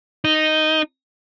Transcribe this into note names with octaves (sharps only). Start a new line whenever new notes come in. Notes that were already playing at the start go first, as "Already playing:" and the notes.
D#4